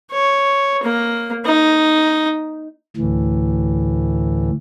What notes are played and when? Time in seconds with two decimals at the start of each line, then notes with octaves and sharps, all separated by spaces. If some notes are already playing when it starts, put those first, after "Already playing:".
0.11 C#5
0.83 A#3
1.45 D#4
2.96 D2 A2 E3